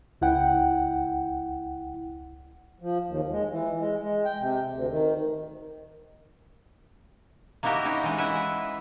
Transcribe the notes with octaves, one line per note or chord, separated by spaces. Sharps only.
C#2 E4 F#5 G5
F3
D#2
G#3
E3
G#3
G#3
G5
C3
D2
D#3
A#3 D#4 E4 F#4 G4 A#4
C#4 D#4 E4
E3 G#3
E4 B4 E5 F#5